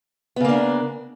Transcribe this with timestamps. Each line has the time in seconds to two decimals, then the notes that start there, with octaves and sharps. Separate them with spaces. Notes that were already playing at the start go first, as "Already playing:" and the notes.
0.36 B3
0.40 C#3
0.45 A#3
0.49 D4